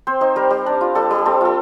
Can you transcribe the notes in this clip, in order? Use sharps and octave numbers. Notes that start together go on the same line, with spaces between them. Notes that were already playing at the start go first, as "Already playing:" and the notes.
C4 C5
D#4 C5
G3 A#4
G3
D4
F4
G3 A4
G3
C4 A4
F4 A4